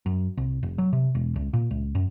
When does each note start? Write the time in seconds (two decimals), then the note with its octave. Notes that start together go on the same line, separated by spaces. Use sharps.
0.06 F#2
0.37 C2
0.63 F1
0.78 F#3
0.93 C3
1.15 E1
1.36 C#2
1.53 A#2
1.71 C#2
1.95 F#2